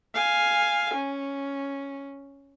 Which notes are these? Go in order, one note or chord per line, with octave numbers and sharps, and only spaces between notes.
F5 G#5
C#4